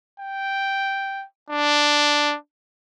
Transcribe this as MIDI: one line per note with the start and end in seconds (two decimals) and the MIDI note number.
0.20 1.25 79
1.50 2.36 62